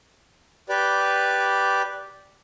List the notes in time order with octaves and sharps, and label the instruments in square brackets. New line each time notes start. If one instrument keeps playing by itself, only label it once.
[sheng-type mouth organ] G4 B4 D5